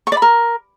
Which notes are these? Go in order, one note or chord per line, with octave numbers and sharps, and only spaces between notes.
C#6
D5
B5
A#4